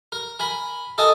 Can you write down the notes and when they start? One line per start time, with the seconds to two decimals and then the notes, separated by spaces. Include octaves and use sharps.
0.12 A#4
0.39 A#4 G#5 B5
0.98 A4 A#4 D#5 G#5 A5